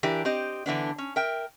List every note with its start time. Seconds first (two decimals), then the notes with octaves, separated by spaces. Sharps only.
0.03 E3 D4 G4 A#4
0.25 C4 G4 D#5
0.66 D3 E3 B3 D4
0.98 C#4
1.16 A#4 E5 G5